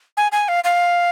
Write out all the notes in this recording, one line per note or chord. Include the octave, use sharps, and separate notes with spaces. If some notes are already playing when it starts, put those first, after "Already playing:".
G#5
G#5
F5
F5